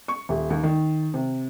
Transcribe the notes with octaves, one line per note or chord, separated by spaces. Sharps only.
C#6
D#1
D#2
D#3
C3